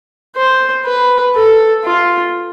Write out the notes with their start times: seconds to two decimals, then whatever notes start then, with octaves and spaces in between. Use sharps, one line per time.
0.36 C5
0.86 B4
1.35 A4
1.85 F4